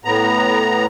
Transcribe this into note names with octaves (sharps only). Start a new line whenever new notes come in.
A2 B3 A#5